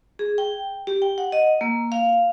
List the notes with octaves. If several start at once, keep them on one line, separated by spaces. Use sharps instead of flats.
G#4
G5
G4
G5
F#5
D#5
A#3
F5